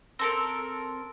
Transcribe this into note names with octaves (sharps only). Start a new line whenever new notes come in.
C4 A4 A#4